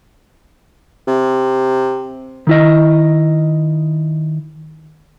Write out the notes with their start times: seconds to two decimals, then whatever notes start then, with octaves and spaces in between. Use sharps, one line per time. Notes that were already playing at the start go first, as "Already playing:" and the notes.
1.08 C3
2.47 D#3 E4 D#5